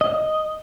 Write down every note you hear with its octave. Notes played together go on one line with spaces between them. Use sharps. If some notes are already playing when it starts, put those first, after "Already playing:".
D#5